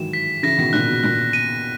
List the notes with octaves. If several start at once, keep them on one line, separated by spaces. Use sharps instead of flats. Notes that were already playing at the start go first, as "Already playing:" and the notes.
Already playing: D#3 E3 F#3 G#3 E7
B6
C#3 E3 A#6
B2 D#3
A#2 C#3 F#6
B2
A#2 F#6
D#7